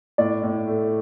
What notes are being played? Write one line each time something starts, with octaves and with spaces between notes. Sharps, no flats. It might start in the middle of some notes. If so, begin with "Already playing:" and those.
A2 D5
A2
A3